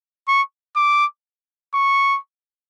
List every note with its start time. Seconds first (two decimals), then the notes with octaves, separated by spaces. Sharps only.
0.28 C#6
0.76 D6
1.74 C#6